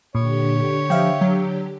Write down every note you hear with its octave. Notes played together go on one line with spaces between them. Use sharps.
A#2 D3 G4 C#5
F3 E5 F5 G5
F#3